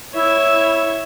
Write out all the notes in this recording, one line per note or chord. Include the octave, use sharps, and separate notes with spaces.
E4 C#5 E5